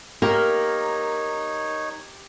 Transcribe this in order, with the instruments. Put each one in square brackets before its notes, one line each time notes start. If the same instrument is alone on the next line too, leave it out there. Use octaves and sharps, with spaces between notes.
[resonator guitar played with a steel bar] A#3 [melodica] D#4 C#5 [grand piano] G4 [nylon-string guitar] A#4